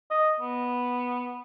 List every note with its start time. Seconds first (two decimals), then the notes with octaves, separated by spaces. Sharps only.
0.11 D#5
0.40 B3